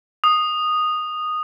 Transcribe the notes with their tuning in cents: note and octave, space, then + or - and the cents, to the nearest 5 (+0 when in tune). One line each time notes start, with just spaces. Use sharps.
D#6 -10